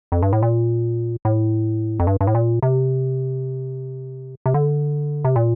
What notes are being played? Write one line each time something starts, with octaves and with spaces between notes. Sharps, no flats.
F2
G2
A2
A#2
A2
F2
G2
G2
A2
A#2
C3
C3
D3
C3
A#2